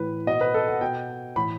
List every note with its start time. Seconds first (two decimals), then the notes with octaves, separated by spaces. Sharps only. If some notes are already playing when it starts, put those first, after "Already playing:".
Already playing: A2 E3 B4
0.27 B2 D#5
0.41 B4
0.54 A4
0.68 F#5
0.81 B2 G5
1.36 A2 E3 B5